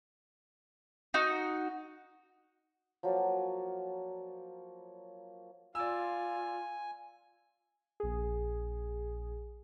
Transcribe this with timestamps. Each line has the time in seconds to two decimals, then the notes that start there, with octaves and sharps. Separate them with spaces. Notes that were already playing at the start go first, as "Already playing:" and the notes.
1.14 D#4 F#4
3.03 F3 F#3 A#3 D5
5.75 F4 D5 F5 G#5 E6
8.00 A#1 G#4